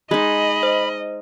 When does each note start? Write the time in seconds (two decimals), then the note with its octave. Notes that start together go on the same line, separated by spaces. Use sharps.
0.11 G#3 D#4 D#5 B5
0.63 C5